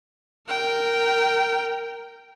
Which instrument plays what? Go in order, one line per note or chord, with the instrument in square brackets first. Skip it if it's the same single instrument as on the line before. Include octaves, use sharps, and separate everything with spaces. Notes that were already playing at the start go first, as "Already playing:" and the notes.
[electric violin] A#4 G5